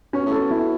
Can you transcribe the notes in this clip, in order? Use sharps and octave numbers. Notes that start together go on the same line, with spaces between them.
B2 C#4
A2
A4
B2
E4